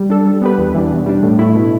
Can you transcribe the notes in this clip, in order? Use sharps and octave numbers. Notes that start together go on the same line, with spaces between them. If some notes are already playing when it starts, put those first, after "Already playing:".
Already playing: G3
D4 A4
G3
B3 G4 B4
E2
E3 G3 D4
B2
G3 D4
A2
A3 E4
B2